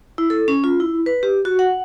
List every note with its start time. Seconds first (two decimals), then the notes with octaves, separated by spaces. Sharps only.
0.18 E4
0.30 A4
0.48 C#4
0.64 F4
0.80 E4
1.06 B4
1.23 G4
1.45 F#4
1.59 F#5